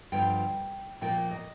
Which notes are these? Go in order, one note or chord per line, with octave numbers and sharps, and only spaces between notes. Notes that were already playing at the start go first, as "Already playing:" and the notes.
G2 D3 F3 G5
A#2 F3 A#3 G5
D#5